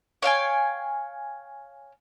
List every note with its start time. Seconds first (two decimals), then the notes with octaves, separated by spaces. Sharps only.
0.22 C#5 F5 G5 G#5